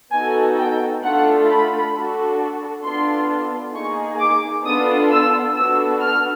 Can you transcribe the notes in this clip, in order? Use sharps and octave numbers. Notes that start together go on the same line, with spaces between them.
B3 D#4 F#4 A4 G#5
G5
A3 D4 F4 A4 F#5
B5
D4 F#4 A4
B3 D4 F4 A4 C6
A#3 D#4 G#4 C#6
D6
B3 D4 F4 A4 D#6
E6
B3 D4 F#4 A4 E6
F6